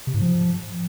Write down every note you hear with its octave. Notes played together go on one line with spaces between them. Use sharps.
C3
G#2
F3